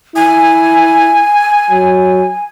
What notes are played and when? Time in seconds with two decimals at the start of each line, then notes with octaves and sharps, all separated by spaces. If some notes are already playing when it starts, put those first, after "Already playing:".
0.16 E4 G#5
1.70 F#3